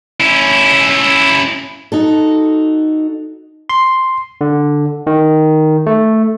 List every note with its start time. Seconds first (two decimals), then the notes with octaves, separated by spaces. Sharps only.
0.20 C#4 E4
1.92 D#4 F#4 A4
3.69 C6
4.41 D3
5.07 D#3
5.87 A3